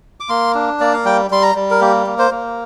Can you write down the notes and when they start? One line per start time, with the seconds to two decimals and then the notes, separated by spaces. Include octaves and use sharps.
0.20 D6
0.29 A#3 C6
0.55 D4
0.80 A#3 D5
0.93 F5
1.05 G3 G5
1.31 G3 C6
1.42 A#5
1.55 G3
1.70 A#4
1.81 A#3 G4
2.07 A#3
2.19 C5
2.31 A#3